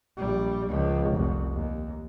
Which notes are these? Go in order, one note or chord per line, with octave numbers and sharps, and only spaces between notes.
A#1 G3
C#2 F3
F1 C2
D#2